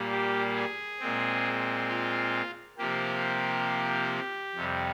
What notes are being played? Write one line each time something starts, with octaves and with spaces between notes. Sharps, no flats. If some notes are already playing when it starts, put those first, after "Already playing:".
Already playing: A#2 G3 A#3
G4
G#4
A#2 G#3 C4
F4
C3 F3 A#3 G4
F2 C3 G3